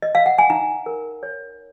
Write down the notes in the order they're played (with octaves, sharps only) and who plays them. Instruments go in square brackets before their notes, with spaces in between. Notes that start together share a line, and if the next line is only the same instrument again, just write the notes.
[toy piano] D#5
F5
F#5
G#5
D#4 A#5
A#4
C#5